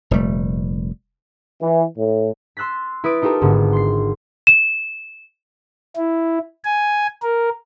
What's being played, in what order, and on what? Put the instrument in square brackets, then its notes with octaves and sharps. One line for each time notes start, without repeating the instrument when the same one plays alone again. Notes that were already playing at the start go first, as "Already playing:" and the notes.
[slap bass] F1 A#2 G3 A3
[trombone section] E3
A2
[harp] C6 E6 F#6 A6 B6
E4 B4 D#6 A6 D7
D#4 F4 G4 A4 A#4
G#1 G#2 D3 B3
C6 C7
[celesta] E7
[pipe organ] E4
G#5
A#4